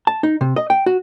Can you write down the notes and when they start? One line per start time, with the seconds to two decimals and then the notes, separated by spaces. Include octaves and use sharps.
0.07 A5
0.23 D#4
0.41 C3
0.56 D#5
0.70 G5
0.86 F#4